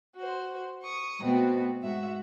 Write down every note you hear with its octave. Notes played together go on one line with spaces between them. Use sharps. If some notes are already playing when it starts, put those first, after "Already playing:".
F#4 C5
C#6 D#6
B2 A3 B3 C4 F#4
G#2 F#4 E5